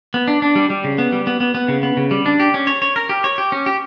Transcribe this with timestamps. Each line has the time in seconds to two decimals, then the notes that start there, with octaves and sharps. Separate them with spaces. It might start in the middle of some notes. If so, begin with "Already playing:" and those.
0.14 B3
0.28 D4
0.42 D4
0.55 G3
0.70 G3
0.84 C#3
0.98 B3
1.12 G3
1.27 B3
1.40 B3
1.55 B3
1.68 C#3
1.83 B3
1.97 C#3
2.11 G3
2.26 D4
2.40 G4
2.54 C#4
2.67 C#5
2.82 C#5
2.96 A#4
3.09 G4
3.24 C#5
3.38 G4
3.52 C#4
3.66 G4